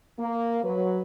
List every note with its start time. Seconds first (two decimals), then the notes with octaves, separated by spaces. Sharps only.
0.20 A#3
0.64 F#3 B4